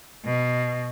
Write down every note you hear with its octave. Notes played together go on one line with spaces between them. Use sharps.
B2